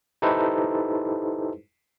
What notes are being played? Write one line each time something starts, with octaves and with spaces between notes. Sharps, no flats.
D#4 E4 G4 A4 B4 C5